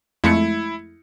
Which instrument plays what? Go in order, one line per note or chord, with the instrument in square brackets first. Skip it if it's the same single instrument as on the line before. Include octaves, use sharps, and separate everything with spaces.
[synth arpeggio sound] F2 G#3 A3 [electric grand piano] E4 C#7